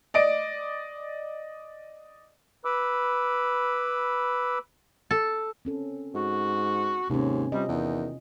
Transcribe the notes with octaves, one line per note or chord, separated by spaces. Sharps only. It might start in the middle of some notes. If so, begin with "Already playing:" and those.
D5 D#5 D7
B4 B5 D6 E6
A4
C4 C#4 A4
G#2 F#4
D#2 G#2 C3 C#4
C3 G3 F4 D#5
E2 D#3